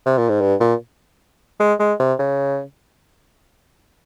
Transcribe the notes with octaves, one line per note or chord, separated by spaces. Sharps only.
C3
A#2
G#2
G2
A#2
G#3
G#3
C3
C#3